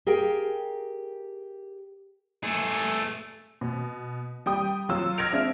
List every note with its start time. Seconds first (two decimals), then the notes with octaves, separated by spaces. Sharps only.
0.06 G4 G#4 A#4 F5 G5
2.44 A3 G#4
3.61 B2
4.46 G3 G5 D#6
4.89 F#3 F4 E6
5.18 F6 G#6 A#6 D7 F7
5.32 G#3 C4 D4 E5 F5